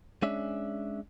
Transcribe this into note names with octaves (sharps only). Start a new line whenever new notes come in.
G#3 C#4 D4 E5